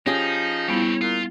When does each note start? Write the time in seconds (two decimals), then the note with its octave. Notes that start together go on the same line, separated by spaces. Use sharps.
0.07 F3 C#4 D#4 G4 G#4
0.68 G3 B3 C4 E4 C#5
1.01 A#2 F4